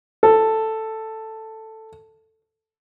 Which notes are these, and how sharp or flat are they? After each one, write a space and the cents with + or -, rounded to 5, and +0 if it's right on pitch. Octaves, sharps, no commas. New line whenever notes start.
A4 +5